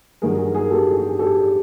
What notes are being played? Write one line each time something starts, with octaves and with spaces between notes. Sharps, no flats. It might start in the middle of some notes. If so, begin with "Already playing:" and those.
G2 D#3 F#3 G#4 A#4
G#4
G#4 A#4
G4 A4
G#4
G4
G#4
G4 A4